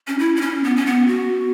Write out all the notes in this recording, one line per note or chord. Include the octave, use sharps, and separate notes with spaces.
C#4
E4
E4
C#4
B3
C#4
B3
F#4